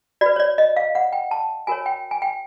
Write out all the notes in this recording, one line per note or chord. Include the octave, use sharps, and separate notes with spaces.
F#4 B4 D5
C#5
D5
D#5
F5
F#5
G5
A5
F#4 A#4 C#5 G#5
G5
G#5
G5